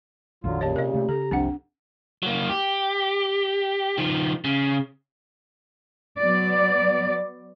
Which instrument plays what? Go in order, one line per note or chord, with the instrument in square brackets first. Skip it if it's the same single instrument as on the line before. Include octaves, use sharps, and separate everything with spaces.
[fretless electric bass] A#1 F2 D#3 [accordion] D3 F#3 F4
[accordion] A#2 C#3 [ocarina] G4 [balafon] C#5 D#5 A5
[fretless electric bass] C3 [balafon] A#4 D#5
[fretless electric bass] C3 A3
[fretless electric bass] C#3 [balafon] A4 [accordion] A#5
[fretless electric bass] F#1 C2 F3 [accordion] C3 [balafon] C4 D4 F#5
[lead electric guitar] F#3 A#3
G4
D#3 F3
C#3
[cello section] F#3 B3 D5